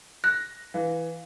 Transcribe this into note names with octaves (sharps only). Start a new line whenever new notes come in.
F#6 A#6
E3 D#5 F5